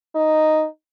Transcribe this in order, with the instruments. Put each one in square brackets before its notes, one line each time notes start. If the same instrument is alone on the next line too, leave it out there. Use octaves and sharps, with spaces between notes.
[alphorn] D#4